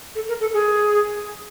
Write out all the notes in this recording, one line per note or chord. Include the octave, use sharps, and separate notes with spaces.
A4
A#4
A4
G#4